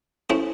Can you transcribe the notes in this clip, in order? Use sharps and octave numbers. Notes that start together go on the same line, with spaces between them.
A3 C#4 E4 C5